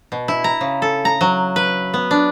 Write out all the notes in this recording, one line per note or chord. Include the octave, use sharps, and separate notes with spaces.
B2
E4
A#5
C#3
A4
A#5
F#3
B4
B3
D4